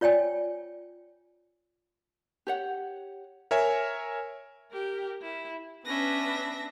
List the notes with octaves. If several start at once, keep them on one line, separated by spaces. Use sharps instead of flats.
F4 C#5 D5 G5 G#5
G4 C#5 F#5
A#4 C#5 E5 G#5
G4 A#4
E4
B3 C#4 D4 B4 E5 A#6